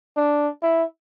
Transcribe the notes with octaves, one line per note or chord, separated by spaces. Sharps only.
D4
E4